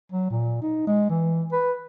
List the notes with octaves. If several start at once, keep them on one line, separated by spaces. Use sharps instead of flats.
F#3
A#2
D#4
G#3
E3
B4